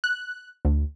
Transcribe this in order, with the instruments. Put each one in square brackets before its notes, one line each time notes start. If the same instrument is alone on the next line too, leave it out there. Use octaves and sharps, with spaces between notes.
[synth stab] F#6
D2